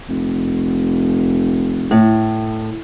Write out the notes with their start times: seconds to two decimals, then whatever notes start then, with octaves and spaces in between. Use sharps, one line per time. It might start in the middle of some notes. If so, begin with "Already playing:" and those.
0.09 F1
1.91 A2